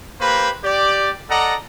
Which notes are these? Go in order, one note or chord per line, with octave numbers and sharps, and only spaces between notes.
A#3 G4 B4 C5 B5
G4 D5
A4 D5 D#5 F#5 A#5